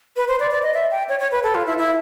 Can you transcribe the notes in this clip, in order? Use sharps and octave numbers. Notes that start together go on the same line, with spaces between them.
B4
C5
D5
D5
D#5
E5
G5
C#5
C#5
B4
A4
F4
E4
E4